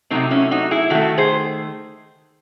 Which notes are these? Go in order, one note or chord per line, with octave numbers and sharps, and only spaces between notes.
C3 F#3 A3 C4 D#4
C#4 E4
D#4 F#4
E4 G#4
D#3 A3 F#4 A4
G#4 C5